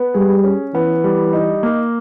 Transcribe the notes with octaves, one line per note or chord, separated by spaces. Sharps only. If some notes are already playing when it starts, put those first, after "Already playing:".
Already playing: B3
G3 G#4
C#4
E3 B3
G3
D#4
A#3